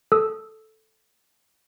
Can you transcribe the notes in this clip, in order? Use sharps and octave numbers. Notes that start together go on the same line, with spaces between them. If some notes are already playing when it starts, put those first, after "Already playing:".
A4 D#6 E6